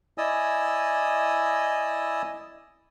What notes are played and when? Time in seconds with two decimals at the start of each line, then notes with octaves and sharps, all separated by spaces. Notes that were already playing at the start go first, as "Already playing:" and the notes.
0.18 E4 D5 D#5 G#5 D#6 E6